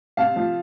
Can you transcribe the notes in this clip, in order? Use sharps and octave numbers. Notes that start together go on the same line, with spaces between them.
C3 F5 A5
F3